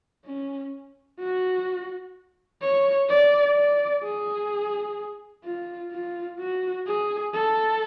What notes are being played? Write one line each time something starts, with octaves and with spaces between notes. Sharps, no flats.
C#4
F#4
C#5
D5
D5
G#4
F4
F4
F#4
G#4
A4